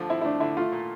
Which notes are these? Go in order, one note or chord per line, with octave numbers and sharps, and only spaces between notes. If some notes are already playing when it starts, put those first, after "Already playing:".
Already playing: D3 F3 A3
C4 E4
E4
A3 D4
D3 E4
A3 F4
A#2